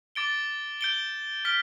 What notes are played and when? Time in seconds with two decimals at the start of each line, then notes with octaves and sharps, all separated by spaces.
0.15 D6 A6 D7 G7
0.81 G6 D7 G7
1.45 F6 B6 D7 G7